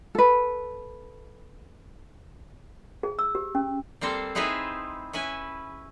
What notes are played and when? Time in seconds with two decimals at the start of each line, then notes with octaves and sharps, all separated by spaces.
0.15 A4 B4
3.03 G#4
3.19 E6
3.35 G4
3.55 C#4
4.01 G3 A#3 C4 A4 C5
4.35 C4 D#4 E4 G#4 B4 C5
5.13 C#4 E4 B4 G#5